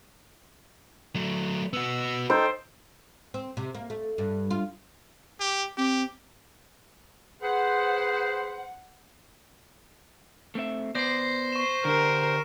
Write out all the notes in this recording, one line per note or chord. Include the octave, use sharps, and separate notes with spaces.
F#3 A3
B3 F#4 E6
D#4 A4 C5 G5
C4
C3
A#3
A3
G2
F4
G4
C4 G4
G#4 B4 C5 F#5
A3 C4 E5
B3 C5 D5 A#6 C7
C#6 E7
D3 D4 G4 A#4